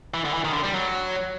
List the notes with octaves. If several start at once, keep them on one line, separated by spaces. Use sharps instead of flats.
E3
D3
E3
D#3
D3
G3
F#3